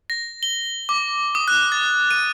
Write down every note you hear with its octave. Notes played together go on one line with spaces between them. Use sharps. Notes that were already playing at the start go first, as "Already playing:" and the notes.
A#6
G7
D6
D#6
F#6
A6
D#7